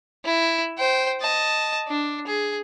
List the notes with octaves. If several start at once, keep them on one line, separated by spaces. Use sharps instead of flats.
E4
C5 G5
D#5 A5
D4
G#4